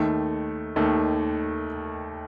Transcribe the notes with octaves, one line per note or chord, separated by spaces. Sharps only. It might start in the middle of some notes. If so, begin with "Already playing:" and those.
Already playing: D#2 D#3 A3
D#2 D#3 A3